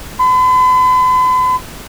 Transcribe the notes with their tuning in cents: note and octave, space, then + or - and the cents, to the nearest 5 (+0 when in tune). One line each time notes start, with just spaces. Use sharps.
B5 +45